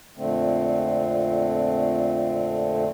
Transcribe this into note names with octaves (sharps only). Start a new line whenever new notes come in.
F2 A#2 D3 A3 C4